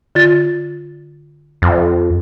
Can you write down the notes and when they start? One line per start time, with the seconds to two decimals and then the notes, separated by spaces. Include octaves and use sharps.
0.15 D3 F4 A6
1.62 F2